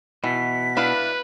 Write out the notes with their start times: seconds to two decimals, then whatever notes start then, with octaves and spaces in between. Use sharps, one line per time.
0.24 B2 E3 B6
0.77 D4 E4 B4 F5